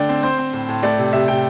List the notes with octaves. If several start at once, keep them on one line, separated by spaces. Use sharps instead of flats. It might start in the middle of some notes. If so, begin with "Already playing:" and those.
Already playing: D3 A3 D5 G5
C4
C4 C5
C4
A2
A2
A3 D5
C3
C3 E5
C3 G5